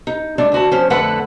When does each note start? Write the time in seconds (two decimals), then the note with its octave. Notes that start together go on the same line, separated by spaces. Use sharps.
0.07 D#4
0.38 G#3 A3 D4 D5
0.52 D2 F#4 A5
0.72 F3 C#4 C5
0.90 F2 D3 A3 A4 B4 F#5